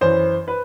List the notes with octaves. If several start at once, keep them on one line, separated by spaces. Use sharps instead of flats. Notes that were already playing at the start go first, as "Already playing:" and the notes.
F#2 E3 C5
B4